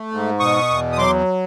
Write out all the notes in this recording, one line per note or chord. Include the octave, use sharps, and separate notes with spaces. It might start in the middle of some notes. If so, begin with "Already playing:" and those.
Already playing: A3
G#2
B2 C#6 D#6
E2
D#6
F#3 C6 D6